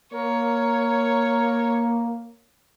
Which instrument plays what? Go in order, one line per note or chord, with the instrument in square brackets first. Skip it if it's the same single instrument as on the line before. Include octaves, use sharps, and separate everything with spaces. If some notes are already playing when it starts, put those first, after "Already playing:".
[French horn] A#3 [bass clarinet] A#4 [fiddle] C#5